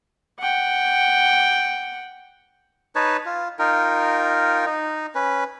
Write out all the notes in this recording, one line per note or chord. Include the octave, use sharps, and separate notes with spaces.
F#5 G5
D#4 B4 C#5 A5
F4
D#4 F4 A#4 G5
D#4
C#4 B4